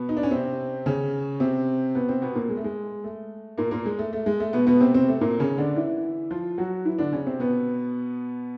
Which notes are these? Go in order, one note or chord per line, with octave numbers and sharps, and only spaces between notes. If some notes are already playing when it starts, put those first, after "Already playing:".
Already playing: B2 B3
D#4
D4
C#4
C3 C4
C#3 C#4
C3 C4
B2 B3
C3 C4
B2 B3
A#2 A#3
G#3
A3
G#3
A3
A#2 A#3
A#2 A#3
G#3
A3
A3
G#3
A3
B2 B3
B2 B3
C3 C4
C3 C4
A3
A#2 A#3
C#3 C#4
D3 D4
E3 E4
F3 F4
F#3 F#4
E3 E4
D3 D4
C#3 C#4
C3 C4
B2 B3